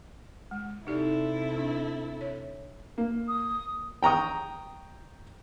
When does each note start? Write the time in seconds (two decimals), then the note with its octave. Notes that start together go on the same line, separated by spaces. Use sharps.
0.51 G#3
0.87 C3 D#4 E4 G4 A4 D5
1.57 D4
2.21 C#5
2.98 A#3
3.28 D#6
4.03 G5 A#5 C#6 D#6